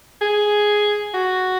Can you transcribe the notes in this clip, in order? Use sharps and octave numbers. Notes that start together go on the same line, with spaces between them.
G#4
F#4